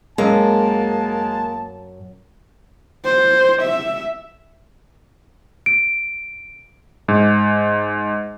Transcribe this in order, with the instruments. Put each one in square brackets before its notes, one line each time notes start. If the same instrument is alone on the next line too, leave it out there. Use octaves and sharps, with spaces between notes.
[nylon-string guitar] F#2 [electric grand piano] G#3 [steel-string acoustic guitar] A#3 [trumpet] A5
[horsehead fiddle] C5
E5
[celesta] D7
[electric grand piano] G#2